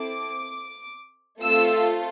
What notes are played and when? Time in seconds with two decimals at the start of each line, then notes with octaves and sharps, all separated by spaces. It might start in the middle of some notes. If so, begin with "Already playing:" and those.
Already playing: C4 E4 A4 D6
1.42 A3 C4 F4 A4 E6